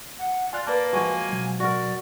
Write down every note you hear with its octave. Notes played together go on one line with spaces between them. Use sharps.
F#5
F4 D5 G#5 F#6
A#3 B4 D5 A5
F3 G#3 F#4 G#5
B2 F#3
F#4 A#4 D5